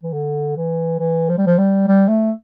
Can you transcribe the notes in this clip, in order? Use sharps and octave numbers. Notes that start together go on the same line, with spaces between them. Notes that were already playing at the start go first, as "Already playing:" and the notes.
E3
D3
E3
E3
F3
G3
F3
G3
G3
A3